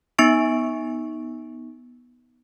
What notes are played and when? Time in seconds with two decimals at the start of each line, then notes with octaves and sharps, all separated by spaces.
0.19 B3 D#4 C#6 D7